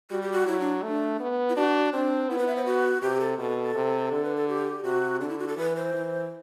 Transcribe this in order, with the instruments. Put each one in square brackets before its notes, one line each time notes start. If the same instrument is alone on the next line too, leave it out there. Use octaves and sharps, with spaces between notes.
[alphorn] G3 [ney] F#4
[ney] G4
F#4
[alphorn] F#3 [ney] E4
[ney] D4
[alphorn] A3 [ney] D4
[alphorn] B3
[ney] E4
[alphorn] D4 [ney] F#4
[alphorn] C4 [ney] D4
[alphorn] B3 [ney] E4
[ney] B4
E5
C5
F#4
[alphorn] C3 [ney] G4
[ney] A4
[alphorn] B2 [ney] A4
[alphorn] C3
D3
[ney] B4
A4
G4
[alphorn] C3 [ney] F#4
[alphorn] D3 [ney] D4
[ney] E4
F#4
A4
[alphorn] E3 [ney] B4
[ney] C5
[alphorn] E3